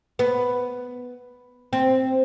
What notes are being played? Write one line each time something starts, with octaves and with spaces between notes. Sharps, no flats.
B3
C4